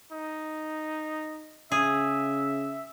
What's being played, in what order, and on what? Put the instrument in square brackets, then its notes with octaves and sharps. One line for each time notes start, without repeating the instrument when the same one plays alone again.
[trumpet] D#4
[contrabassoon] C#3 [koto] G#4 [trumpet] E5